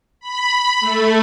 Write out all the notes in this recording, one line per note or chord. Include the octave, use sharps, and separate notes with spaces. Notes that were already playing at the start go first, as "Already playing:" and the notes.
B5
A3